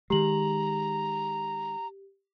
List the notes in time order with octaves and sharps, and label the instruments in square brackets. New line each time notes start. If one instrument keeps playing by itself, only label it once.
[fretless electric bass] D#3 G#3 [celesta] G4 F#7 [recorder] A#5